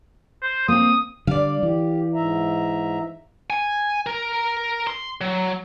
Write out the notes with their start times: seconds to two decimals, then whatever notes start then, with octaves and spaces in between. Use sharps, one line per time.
0.42 C5
0.68 A#3 C4 D#6
1.27 D3 G3 D5 F5
1.63 E3 G4
2.14 G#2 E5 A#5
3.50 G#5
4.06 A#4
4.87 C6
5.21 F#3